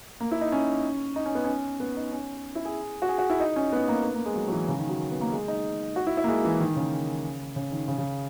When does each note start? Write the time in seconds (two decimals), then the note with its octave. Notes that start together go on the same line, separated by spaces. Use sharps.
0.20 A#3
0.31 E4
0.41 D#4
0.52 C#4
1.16 D#4
1.26 C#4
1.35 B3
1.45 C#4
1.80 B3
1.97 D#4
2.12 C#4
2.55 E4
2.65 G#4
3.02 F#4
3.09 G#4
3.18 F#4
3.30 E4
3.40 D#4
3.56 C#4
3.73 B3
3.88 A#3
4.04 B3
4.15 A#3
4.26 G#3
4.36 F#3
4.48 F#3
4.52 E3
4.68 C#3
4.79 D#3
4.89 F#3
5.11 B3
5.21 A#3
5.32 G#3
5.48 D#4
5.96 F#4
6.07 E4
6.17 E4
6.24 A#3
6.28 G#3
6.45 E3
6.60 D#3
6.76 C#3
7.56 C#3
7.72 D#3
7.88 C#3
7.98 C#3